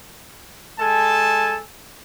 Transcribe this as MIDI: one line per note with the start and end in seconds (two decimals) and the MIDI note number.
0.79 1.60 56
0.79 1.60 69
0.79 1.60 80
0.79 1.60 81